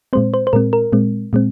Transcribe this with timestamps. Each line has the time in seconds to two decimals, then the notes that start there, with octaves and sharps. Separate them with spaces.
0.13 A#2 G#3 C4 C5
0.34 C5
0.47 C5
0.53 A#2 G#3 C4 A#4
0.73 A#4
0.92 A#2 G#3 C4
1.33 A#2 G#3 C4